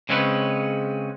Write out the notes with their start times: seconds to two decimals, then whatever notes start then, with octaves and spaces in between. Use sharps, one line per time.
0.09 C#3 G#3 C4 C#4 A4 B4